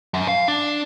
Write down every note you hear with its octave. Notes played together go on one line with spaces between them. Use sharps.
F#2
F5
D4